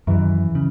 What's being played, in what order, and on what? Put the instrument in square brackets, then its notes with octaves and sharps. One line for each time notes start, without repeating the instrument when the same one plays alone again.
[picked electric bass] F#2 [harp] E3
[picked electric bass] C#3